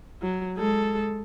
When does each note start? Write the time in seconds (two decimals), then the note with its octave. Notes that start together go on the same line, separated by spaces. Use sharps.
0.22 F#3
0.56 G#3 A4